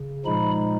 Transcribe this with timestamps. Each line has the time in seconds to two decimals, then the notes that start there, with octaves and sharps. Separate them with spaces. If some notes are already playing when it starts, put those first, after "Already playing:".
Already playing: C#3
0.25 A#2 F3 G#3 D#4 B5